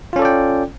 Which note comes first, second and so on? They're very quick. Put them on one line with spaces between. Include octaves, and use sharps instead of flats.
F4 C#4 A4 D5 G5